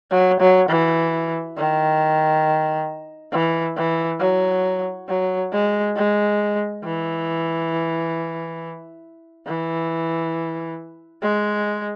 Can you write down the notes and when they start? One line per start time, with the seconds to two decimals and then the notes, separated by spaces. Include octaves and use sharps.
0.11 F#3
0.40 F#3
0.69 E3
1.57 D#3
3.32 E3
3.77 E3
4.20 F#3
5.08 F#3
5.52 G#3
5.96 G#3
6.83 E3
9.47 E3
11.22 G#3